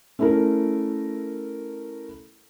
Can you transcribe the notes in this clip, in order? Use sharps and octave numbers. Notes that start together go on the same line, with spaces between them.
A3 C#4 E4 A4 A#4